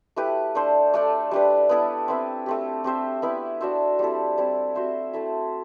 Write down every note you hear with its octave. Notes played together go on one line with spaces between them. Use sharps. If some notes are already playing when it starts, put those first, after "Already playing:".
A3 E4 G4 B4
A3 D4 A4 C5
A3 D4 A4 D5
G3 D4 G4 B4
B3 E4 A4
C4 E4 B4
A3 C4 G4
C4 G4 C5 E5
B3 E4 B4 E5
D4 F#4 C5 E5
G3 C4 E4 A4
G3 C4 E4
C4 F#4 C5 E5
A3 E4 A4 E5